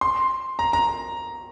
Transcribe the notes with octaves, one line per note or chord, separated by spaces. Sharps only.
C6
A#5
A#5